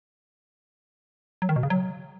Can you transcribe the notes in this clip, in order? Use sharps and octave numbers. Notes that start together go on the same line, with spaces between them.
F#3
D#3
B2
C#3
F#3